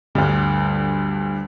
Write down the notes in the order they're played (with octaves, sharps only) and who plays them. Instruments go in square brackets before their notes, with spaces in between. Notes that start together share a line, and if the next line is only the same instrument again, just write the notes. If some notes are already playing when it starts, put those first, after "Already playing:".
[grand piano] D2 G2 [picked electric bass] D3 G3